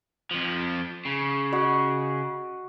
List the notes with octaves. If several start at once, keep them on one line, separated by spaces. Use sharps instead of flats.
F2 F3
C#3
F#4 D#5